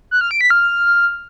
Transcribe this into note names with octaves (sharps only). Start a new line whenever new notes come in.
F#6
F6
D7
B6
F6